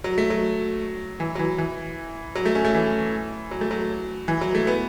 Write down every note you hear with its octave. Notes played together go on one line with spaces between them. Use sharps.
F#3
A3
F#3
E3
F#3
E3
E3
F#3
A3
C#4
A3
E3
F#3
A3
F#3
E3
F#3
A3
B3